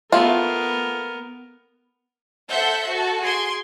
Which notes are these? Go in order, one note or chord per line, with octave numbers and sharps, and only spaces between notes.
A3 B3 F4 A#4
A4 C5 E5 F#5 G6
F#4 A4
G#4 C6 G#6 D7